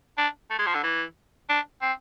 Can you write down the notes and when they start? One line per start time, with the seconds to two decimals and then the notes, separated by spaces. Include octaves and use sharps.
0.18 D4
0.50 A3
0.59 G#3
0.66 F3
0.74 D3
0.83 E3
1.49 D4
1.82 C4